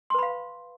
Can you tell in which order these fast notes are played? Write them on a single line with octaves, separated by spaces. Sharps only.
C6 B4 B5 F5